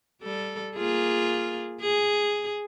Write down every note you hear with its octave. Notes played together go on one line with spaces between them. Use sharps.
G3 A4
A#3 F4 G#4
G#4